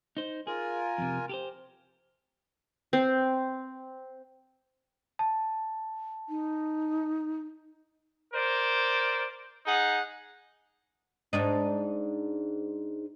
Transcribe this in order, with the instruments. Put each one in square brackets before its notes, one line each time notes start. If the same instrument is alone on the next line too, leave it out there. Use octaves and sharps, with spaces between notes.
[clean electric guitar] D#4 C5
[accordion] F4 A#4 G#5 [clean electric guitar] G#4
[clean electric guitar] F2 C3
G4 A4 C5
[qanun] C4
[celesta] A5
[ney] D#4
[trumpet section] A#4 C5 D5
D#4 G#4 F#5
[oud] G#2 D4 D#4